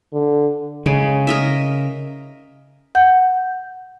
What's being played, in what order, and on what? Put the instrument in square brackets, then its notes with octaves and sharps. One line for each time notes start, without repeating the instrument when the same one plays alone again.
[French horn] D3
[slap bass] C#3 [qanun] G#3
[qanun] A#4 D#5 E5
[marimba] F#5 G6